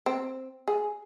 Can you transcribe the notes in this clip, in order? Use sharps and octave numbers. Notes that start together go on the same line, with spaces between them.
C4
G#4